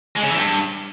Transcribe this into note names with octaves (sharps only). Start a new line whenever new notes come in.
G#3
C#3
E3
G2